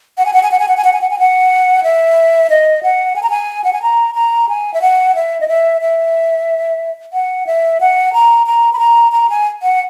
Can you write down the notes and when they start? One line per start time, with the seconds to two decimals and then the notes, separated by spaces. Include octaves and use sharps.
0.18 F#5
0.25 G#5
0.33 F#5
0.43 G#5
0.51 F#5
0.59 G#5
0.68 F#5
0.77 G#5
0.84 F#5
0.93 G#5
1.01 F#5
1.10 G#5
1.19 F#5
1.83 E5
2.50 D#5
2.83 F#5
3.16 G#5
3.23 A#5
3.30 G#5
3.64 F#5
3.73 G#5
3.82 A#5
4.14 A#5
4.49 G#5
4.74 E5
4.82 F#5
5.15 E5
5.40 D#5
5.48 E5
5.81 E5
7.13 F#5
7.47 E5
7.80 F#5
8.13 A#5
8.46 A#5
8.73 B5
8.79 A#5
9.12 A#5
9.30 G#5
9.62 F#5